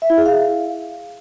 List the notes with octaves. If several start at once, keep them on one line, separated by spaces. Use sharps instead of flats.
E5
E4
G#4
F5